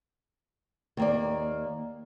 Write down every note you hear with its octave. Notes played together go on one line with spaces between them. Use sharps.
D#2 A#3 D5